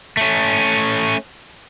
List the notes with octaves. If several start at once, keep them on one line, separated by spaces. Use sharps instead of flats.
A3 C#4